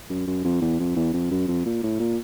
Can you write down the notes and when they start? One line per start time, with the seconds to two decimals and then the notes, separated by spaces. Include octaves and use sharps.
0.10 F#2
0.27 F#2
0.44 F2
0.61 E2
0.79 F2
0.96 E2
1.13 F2
1.31 F#2
1.48 F2
1.65 A#2
1.83 A2
1.99 A#2